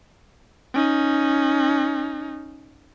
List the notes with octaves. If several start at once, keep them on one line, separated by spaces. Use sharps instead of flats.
C#4 D#4